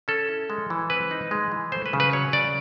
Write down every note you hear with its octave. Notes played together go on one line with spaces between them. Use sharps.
C#4 A4
E4
G#3
E3
C4 B4
D#4
G#3
E3
A3 C5
B4
C#3
B4
F#3 C#5
C#3 D5